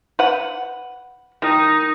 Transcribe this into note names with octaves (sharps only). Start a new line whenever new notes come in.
B4 F#5
D#3 D#4